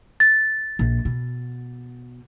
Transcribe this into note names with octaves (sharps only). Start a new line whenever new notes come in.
A6
A#1
B2